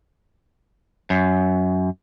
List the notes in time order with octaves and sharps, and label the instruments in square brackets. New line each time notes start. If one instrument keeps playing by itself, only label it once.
[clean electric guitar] F#2